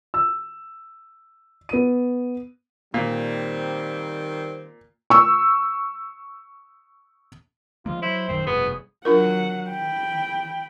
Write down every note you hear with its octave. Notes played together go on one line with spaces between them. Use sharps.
E6
B3 D#7
A#2 D#3 G3 C4
C#6 E6
F3 G#3 A#3 F4
F#3 E4 C5
A#1 F#2 D#3 C4
F1 G2 B2 B3 G#4
F#3 D4 F4 A#4 F#5
G5 B5